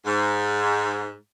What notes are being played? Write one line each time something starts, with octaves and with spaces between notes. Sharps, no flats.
G#2